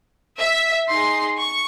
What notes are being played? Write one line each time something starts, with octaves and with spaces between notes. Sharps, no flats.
E5
D#4 G#4 C6
C#6